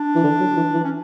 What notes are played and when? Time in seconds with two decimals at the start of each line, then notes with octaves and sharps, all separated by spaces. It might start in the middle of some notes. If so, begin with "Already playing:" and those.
Already playing: D4
0.15 E3
0.24 D3
0.40 F#3
0.56 E3
0.74 E3
0.84 C#4